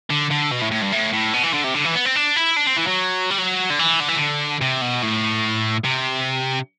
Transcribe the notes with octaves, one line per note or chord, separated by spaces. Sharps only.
D3
D3
B2
A2
A2
G2
A2
A2
B2
E3
D3
C3
D3
E3
B3
C4
D4
E4
D4
C4
E3
F#3
G3
F#3
D3
E3
D3
E3
D3
C3
B2
A2
C3